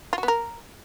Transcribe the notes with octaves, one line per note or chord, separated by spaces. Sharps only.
F4
F#4
B3
A#4